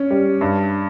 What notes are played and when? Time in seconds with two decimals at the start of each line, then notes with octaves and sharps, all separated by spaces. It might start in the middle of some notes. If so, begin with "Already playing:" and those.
Already playing: C#4
0.10 G3
0.41 G2